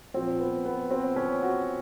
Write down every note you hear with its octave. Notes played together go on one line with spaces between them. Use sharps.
A#2 F3 C4
B3
B3
C4
C#4
F#4